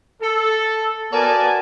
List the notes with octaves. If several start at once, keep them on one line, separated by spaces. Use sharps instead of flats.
A4
B3 F#4 A#4 D5 G#5 A5